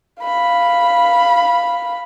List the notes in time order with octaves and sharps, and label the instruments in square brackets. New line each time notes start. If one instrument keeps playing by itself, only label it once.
[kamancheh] F5 B5